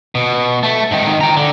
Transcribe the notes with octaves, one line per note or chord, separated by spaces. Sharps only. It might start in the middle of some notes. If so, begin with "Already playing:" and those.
B2
A3
G#2 D#3
G5 A#5
D3